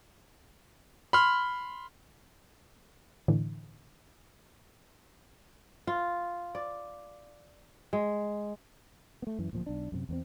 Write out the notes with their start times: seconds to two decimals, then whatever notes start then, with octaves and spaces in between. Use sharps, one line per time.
1.13 B5 C6 F6
3.28 A2 D3 E3
5.87 F4
6.55 D5
7.93 G#3
9.22 A3 B3
9.38 F#2 E3
9.53 D1 A#2 F3
9.66 B1 D4
9.92 F#2 A2 C3
10.09 E2 B3 C4